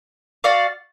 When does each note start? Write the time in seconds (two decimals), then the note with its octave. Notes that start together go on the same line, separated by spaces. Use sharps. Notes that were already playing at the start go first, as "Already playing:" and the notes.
0.44 F#4 D5 F5